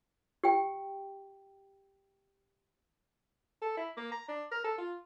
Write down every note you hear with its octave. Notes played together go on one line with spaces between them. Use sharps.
G4 G5
A4
E4
A#3
A#5
D4
A#4
A4
F4